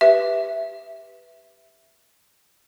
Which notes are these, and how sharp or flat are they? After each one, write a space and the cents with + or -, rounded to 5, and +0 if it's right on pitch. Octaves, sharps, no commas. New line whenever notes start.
G4 +0 B4 +0 E5 +0